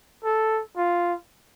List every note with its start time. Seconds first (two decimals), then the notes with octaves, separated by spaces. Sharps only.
0.24 A4
0.77 F4